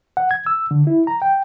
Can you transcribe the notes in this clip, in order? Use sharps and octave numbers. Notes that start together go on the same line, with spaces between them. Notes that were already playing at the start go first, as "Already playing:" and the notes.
F#5
G#6
E6
D3
E4
A#5
G5